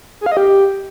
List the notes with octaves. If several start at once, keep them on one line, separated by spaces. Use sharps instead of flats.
G#4
F5
D#5
G4